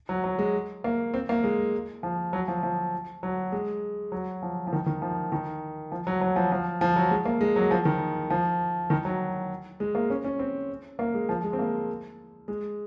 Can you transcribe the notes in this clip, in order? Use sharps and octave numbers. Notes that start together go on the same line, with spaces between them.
F#3
F#3
G#3
A#3
C4
A#3
G#3
F3
F#3
F3
F3
F#3
G#3
F#3
F3
F3
D#3
D#3
F3
D#3
F3
F#3
F#3
F3
F3
F3
F#3
G#3
A#3
G#3
F#3
F3
D#3
F3
D#3
F#3
G#3
A#3
C#4
C#4
C4
A#3
G#3
F3
G#3
C4
A#3
G#3